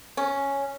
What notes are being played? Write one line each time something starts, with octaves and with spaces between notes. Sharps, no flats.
C#4